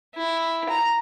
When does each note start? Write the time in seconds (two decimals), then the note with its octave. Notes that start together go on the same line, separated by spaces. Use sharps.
0.15 E4
0.69 A#5